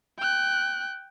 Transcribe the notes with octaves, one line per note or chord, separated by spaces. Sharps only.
G5 F#6